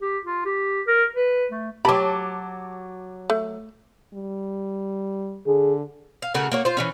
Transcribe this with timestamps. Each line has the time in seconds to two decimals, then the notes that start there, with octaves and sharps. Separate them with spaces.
0.02 G4
0.26 F4
0.46 G4
0.87 A#4
1.16 B4
1.52 A3
1.85 F#3 G4 A5 B5 D6
3.30 A3
4.14 G3
5.47 D3 G#4
6.22 F5
6.34 C#3 A3 F#4 A#4
6.52 A#3 F#4 C#5
6.65 F4 C5
6.77 E3 G3 C#4